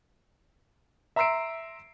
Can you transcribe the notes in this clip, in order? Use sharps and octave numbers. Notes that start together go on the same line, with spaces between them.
E5 A#5 C6 E6 C7 D7